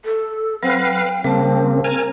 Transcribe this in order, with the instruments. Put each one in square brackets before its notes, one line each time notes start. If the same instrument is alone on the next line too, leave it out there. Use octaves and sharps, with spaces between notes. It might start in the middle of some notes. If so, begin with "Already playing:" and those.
[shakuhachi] A4
[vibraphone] F#3 [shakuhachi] C4 [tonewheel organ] B4 F5
[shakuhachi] G5
[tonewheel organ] C#3 A#3 [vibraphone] G3 A5 [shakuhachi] C4
[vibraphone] A#4 A#5 [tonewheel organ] G#5 F6